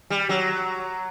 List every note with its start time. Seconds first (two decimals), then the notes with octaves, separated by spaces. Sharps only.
0.10 G3
0.29 F#3